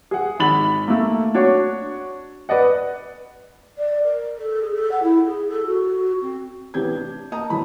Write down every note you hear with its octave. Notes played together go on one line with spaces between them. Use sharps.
G#4 F#5
G#1 B5 A6 F#7
A3 A#3
D4 F#4 C#5
B4 D5 D#5 F#5
D5
A#4
A4
G#4
A4
F#5
E4
G#4
A4
F#4
C4
A1 C3 B3 G4 G6 G#6
D4
A#3 D#5 A5 A#5 D#6
G1 E2 F#3 F#4 B5